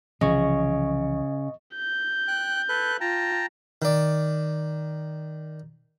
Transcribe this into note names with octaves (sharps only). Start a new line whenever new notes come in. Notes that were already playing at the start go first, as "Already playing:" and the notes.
C2 C#3 E3 F3 D#5 C#6
G6
G5 F#6
A4 B4 F#6
F4 G5 A5 A#5
D#3 D5